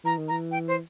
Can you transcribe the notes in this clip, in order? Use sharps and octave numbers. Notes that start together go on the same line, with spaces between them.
E3 A#5
D#3
A#5
E3
G5
C5